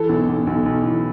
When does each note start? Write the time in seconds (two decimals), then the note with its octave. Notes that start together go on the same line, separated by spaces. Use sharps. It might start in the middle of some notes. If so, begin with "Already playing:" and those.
Already playing: E3 A4
0.09 B1
0.28 B1
0.47 B1
0.66 B1
0.83 E3